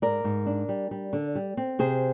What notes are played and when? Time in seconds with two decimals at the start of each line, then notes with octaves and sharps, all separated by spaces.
0.02 G#2 A#4 D5
0.24 G#2
0.46 D4
0.69 G3
0.91 G3
1.13 D3
1.35 G3
1.57 C4
1.79 C3 G#4 C5